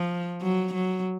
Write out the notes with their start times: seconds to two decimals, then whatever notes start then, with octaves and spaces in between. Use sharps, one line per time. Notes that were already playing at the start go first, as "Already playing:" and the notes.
Already playing: F3
0.42 F#3
0.74 F#3